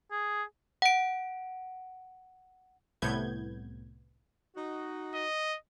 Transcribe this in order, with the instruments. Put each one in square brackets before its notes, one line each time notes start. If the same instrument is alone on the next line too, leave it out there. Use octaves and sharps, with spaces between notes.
[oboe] G#4
[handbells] F#5 D7
[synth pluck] C2 A2 C3 B3 G6 G#6
[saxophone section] D#4 F#4
[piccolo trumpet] D#5